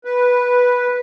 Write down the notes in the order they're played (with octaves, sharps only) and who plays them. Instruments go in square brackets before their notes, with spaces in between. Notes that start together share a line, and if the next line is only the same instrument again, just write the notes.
[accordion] B4